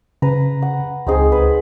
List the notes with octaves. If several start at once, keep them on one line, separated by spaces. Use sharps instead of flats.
C#3 B4 A#5
F#5
C#2 C4 D#4 G#4
B4